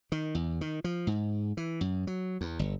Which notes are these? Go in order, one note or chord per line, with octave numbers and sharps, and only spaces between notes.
D#3
E2
D#3
F3
G#2
E3
F#2
F#3
E2
G1